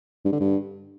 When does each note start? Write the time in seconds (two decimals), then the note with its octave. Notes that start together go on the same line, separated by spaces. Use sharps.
0.25 G2
0.32 D3
0.40 G2